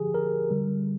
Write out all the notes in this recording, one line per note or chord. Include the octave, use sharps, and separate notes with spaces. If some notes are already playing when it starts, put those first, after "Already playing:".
Already playing: D3 F3 G4 G#4
A#4
D3 G3